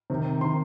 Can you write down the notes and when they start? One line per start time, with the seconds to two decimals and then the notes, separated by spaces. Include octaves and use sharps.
0.10 C3 D#3
0.41 C3 C6
0.45 D#3